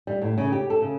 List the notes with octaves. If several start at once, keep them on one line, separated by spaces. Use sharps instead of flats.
G3
A2
C#3
G4
A4
C#3